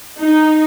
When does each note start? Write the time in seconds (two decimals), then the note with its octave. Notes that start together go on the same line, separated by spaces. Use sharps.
0.19 D#4